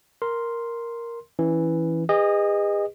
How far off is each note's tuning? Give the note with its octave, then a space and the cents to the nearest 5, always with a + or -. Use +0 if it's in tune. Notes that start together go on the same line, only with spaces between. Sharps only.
A#4 +0 C6 +0
E3 +0 C#4 +0
G#4 -40 B4 +0 D#5 -10